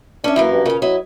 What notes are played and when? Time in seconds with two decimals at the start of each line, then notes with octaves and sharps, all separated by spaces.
0.24 C#4 D4 E5
0.36 F#2 E3 A#3 E4
0.53 G2
0.66 A#2 C#3 F5
0.82 F#3 E4 D#5